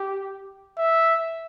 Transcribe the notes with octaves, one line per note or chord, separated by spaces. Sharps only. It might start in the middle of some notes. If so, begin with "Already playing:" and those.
Already playing: G4
E5